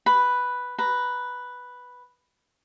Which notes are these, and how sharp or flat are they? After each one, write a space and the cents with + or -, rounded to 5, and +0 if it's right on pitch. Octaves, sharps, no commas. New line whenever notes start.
B4 +0 B5 +0
B4 +0 A#5 +0